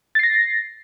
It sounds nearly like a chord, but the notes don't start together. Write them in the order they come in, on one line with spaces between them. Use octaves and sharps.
A6 C7 A#6